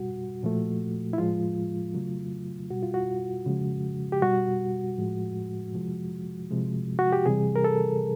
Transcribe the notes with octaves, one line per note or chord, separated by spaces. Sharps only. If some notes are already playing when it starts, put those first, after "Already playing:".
Already playing: B2 G3 F#4
A#2 F3 A3
E4
A2 F3 G#3 F4
C#3 F#3 A3
B2 G3 F#4
F4
F#4
C#3 F3 G#3
G4
B2 G3 F#4
A2 F3 G#3
C3 F3 G#3
C3 F3 G#3
F#4
G4
C3 E3 G3 G#4
A#4
A4